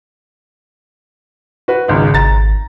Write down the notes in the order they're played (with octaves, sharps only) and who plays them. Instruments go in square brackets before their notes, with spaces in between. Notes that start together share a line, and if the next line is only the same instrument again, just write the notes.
[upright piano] F#4 B4
G#1 C#2 G#2
[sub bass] G#1 [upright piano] A#5 A6